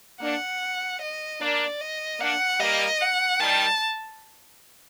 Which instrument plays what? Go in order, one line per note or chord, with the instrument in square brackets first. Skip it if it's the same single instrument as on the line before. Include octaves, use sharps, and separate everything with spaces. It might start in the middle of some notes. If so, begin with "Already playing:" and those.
[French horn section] A#3 D4 [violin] F#5
[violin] D#5
[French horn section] A#3 D4 [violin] D5
[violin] D#5
[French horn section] A#3 D4 [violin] F#5
[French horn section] G3 A#3 [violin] D#5
[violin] F#5
[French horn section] D#3 G3 [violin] A5